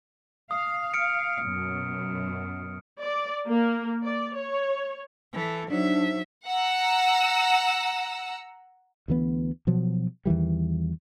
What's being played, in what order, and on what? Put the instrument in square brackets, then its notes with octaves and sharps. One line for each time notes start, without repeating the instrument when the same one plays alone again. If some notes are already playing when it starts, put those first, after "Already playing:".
[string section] F5 [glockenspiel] D#6
[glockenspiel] F6 C#7 D7
[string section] F#2 B2
[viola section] D5
A#3
D5
C#5
[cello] E3 A4
[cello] F#3 E5 [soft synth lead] D4 [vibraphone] D#4 C5
[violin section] F#5 A#5 E6
[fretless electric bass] D2 E3 B3
B2 F3 F#3
E2 D#3 E3 G3